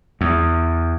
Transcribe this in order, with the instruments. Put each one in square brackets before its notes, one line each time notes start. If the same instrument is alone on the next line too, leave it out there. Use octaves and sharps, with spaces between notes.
[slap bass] E2